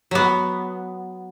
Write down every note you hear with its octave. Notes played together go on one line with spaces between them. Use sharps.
F#3 B3